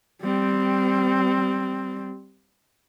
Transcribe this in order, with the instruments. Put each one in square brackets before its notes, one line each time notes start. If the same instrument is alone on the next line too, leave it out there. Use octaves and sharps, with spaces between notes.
[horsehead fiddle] G3 C4